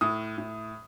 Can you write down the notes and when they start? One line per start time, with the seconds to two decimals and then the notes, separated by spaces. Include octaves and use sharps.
0.01 A2 D#6
0.38 A2